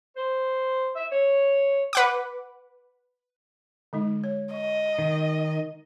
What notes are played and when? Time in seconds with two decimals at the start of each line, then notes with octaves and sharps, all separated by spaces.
0.16 C5
0.96 E5
1.11 C#5
1.93 B4 F#5 D6
3.93 D3 G#3 D#4
4.24 C#5
4.54 D#5 C#6
4.99 D#3